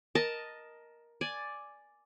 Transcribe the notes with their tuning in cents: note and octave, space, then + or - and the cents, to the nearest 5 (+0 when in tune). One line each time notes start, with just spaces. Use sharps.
A#4 +10 D#5 +0 A5 +0
D5 +0 G#5 +5